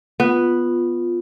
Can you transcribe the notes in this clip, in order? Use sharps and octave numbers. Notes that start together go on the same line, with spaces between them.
B3 F4